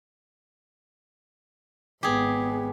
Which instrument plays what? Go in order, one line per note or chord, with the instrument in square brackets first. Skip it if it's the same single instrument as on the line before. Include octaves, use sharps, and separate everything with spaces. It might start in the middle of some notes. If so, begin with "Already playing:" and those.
[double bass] G#1 B3 [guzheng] G4 G#4